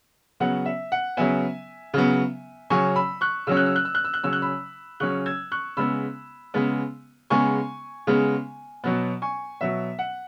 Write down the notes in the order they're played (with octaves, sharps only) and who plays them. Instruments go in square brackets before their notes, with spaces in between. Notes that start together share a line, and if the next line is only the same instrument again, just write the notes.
[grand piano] C#3 F#3 B3 F#5
E5
F#5
C#3 F#3 B3 E5 G#5
C#3 F#3 B3
C#3 F#3 C#4 G#5 C#6
B5 E6
C#6 F#6
C#3 F#3 C#4 E6
F#6
E6
F#6
E6
F#6
E6
F#6
C#3 F#3 C#4 E6
F#6
B5 E6
C#3 F#3 C#4 C#6 F#6
E6 G#6
C#6 F#6
C#3 G#3 B3 B5 E6
C#3 G#3 B3
C#3 G#3 B3 G#5 C#6
C#3 G#3 B3
B2 F#3 B3
G#5 C#6
B2 F#3 B3 E5
F#5